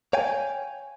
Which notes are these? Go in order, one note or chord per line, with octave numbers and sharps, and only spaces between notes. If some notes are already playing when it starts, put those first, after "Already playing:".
C#5 F5 G5 G#5